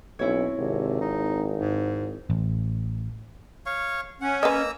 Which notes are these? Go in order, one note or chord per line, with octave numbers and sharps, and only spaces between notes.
B1 C4 C#4 E4 C#5
G#1 C3
D#4
G#2
A1
C#5 F5 C#6
C#4 F#5
A#3 B4 D#5 A#5 E6